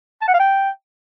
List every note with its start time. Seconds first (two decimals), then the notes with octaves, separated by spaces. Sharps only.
0.22 A5
0.28 F#5
0.34 F5
0.40 G5